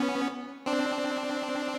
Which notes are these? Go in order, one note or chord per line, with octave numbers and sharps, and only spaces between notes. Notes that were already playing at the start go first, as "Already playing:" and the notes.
Already playing: B3 C#4
C4 D4